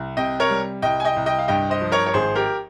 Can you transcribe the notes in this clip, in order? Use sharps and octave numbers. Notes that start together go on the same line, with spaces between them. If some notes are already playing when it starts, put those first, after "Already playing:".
Already playing: C2
C3 D#5 G5
A#4 C#5
G3
C2 D#5 G5
G#5
D#5 G5
C2
D#5 G5
F5
G2 D#5 G5
C5 D#5
F3
A#4 C#5
C#5
G#1 G#4 C5
G4 A#4